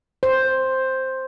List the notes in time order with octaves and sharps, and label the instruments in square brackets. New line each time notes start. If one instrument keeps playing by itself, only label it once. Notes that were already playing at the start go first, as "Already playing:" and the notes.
[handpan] C5